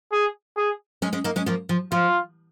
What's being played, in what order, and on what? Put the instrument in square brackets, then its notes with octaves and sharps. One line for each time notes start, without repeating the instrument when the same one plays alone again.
[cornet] G#4
G#4
[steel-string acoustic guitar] G#3 C#4
G#3 C#4
A#3 D#4
G#3 C#4
F3 A#3
F3
[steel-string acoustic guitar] F3 [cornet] F4